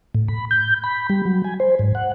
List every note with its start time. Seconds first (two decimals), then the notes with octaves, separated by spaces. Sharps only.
0.14 A2
0.28 B5
0.51 G6
0.84 B5
1.10 G3
1.25 F#3
1.44 G#5
1.60 C5
1.79 G#2
1.95 F#5